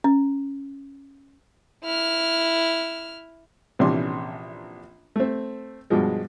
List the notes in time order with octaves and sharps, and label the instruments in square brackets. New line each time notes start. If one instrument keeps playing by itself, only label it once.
[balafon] C#4
[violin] E4 F6
[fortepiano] A#1 C3 E3 C#4 D4 C6
A3 C4
G2 B2 F3 G#3